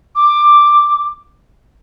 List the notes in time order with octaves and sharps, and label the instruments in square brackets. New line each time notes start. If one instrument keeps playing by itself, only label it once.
[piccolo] D6